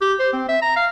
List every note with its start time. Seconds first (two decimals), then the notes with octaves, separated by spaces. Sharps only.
0.02 G4
0.20 C5
0.33 C4
0.49 E5
0.62 A#5
0.76 F5